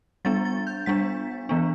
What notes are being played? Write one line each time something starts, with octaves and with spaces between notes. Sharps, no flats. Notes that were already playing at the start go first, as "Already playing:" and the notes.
G3 B3 D4 A6
A6
G6
G3 B3 D4 B6
E3 B3 D4